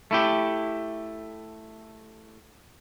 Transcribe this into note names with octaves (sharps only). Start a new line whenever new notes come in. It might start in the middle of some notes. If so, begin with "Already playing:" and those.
A3 E4 G4